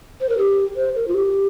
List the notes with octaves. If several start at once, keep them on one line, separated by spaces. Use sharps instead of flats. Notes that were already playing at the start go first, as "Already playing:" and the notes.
C5
A#4
G4
C5
A#4
F4
G4